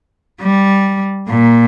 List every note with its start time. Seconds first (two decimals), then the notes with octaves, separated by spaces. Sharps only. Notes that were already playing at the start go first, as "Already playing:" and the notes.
0.42 G3
1.29 A#2